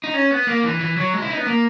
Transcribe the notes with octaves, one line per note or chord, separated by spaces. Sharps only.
D#4
C#4
B3
A#3
E3
E3
F#3
G#3
E4
D#4
B3
A#3